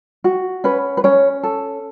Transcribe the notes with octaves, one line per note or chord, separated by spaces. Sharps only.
F#4
C#4 B4
B4
C#4 C#5
A4